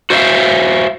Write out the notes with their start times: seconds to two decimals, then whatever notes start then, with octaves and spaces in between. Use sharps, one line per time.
0.10 F#4 C5 C#5 E5 F5